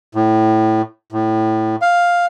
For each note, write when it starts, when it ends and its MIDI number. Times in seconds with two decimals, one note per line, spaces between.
0.15 0.82 45
1.12 1.76 45
1.82 2.26 77